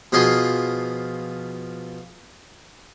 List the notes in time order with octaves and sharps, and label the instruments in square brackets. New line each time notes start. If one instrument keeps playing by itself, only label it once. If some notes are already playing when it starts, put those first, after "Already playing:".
[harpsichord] B2 F3 G#4 C6 D#6